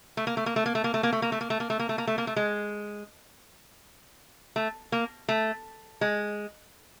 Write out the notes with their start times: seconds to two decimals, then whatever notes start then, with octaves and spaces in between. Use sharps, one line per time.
0.17 A3
0.27 A#3
0.37 A3
0.46 A#3
0.56 A3
0.66 A#3
0.75 A3
0.84 A#3
0.94 A3
1.03 A#3
1.13 A3
1.22 A#3
1.32 A3
1.41 A#3
1.50 A3
1.60 A#3
1.70 A3
1.79 A#3
1.89 A3
1.98 A#3
2.07 A3
2.18 A#3
2.27 A3
2.36 G#3
4.56 A3
4.92 A#3
5.29 A3
6.01 G#3